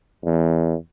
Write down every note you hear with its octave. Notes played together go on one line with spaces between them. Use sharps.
E2